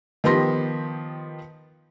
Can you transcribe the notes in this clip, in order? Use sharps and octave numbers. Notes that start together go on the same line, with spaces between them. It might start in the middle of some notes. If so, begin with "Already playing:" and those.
D#3 F3 B3 G4 C6 A#6